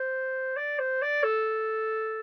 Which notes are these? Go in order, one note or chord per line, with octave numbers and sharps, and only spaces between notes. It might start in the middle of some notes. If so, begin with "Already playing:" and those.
Already playing: C5
D5
C5
D5
A4